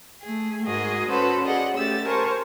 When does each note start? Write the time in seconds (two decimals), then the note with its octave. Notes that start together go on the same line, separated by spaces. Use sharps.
0.22 A3 G#4
0.64 G#2 F#4 G#4 A#4 D#5
1.08 C#4 F#4 A4 B4 C5
1.45 G#4 D5 D#5 F#5
1.76 A3 C#4 G4 E6 A6
2.05 A#4 C5 G#5 A5 C#6